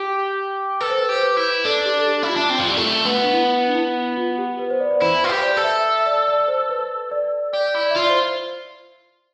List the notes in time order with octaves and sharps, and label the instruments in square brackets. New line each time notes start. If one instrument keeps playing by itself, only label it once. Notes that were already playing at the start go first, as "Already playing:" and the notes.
Already playing: [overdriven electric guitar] G4
[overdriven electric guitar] A4 [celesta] B4
[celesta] C5
B4
[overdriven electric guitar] G4
[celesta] C5
B4
[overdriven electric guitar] E4
[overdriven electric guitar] D4 [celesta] A4
[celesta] G4
A4
G4
[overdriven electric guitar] E4
[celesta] F4
[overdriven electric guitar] D4
C4
F3
G3
A3
B3
[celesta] D4
E4
D4
E4
F4
G4
B4
C5
D5
D5
[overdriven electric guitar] E4 [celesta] C5
[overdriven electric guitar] F4 [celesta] B4
[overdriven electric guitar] G4
[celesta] C5
D5
[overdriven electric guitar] A4
[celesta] E5
E5
D5
D5
C5
B4
D5
[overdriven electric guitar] G4 [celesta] D5
[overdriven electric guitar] E4
[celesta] D5
E5
[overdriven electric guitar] F4 [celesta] D5
[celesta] C5